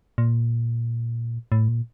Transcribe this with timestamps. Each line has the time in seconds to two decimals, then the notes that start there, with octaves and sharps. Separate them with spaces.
0.18 A#2
1.52 A2
1.68 A#2